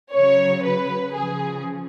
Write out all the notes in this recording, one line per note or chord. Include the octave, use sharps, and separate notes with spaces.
C#3 F#3 C#5
B4
C#3 F3 G#4